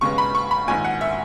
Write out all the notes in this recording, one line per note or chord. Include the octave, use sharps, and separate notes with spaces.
D#2 C#3 G#3 B3 C#6
B5
C#6
B5
A#1 G#2 D#3 G#5
F#5
E5